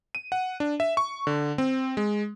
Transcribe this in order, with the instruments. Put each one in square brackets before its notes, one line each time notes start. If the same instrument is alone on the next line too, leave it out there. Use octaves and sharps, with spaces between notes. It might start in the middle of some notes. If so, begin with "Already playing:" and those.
[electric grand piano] D#7
F#5
D4
E5
C#6
D3
C4
G#3